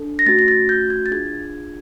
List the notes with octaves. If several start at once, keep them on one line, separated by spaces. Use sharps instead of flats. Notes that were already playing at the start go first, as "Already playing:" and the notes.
Already playing: D4 A4
A#6
A3 C#4 F#4 A6
A#6
A6
G6
G#6
A6
D4 F4 G#4 G#6